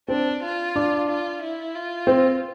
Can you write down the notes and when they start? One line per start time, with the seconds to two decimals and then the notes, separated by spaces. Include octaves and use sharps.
0.08 C4 D4
0.43 F4
0.76 D4
1.08 F4
1.42 E4
1.75 F4
2.07 C4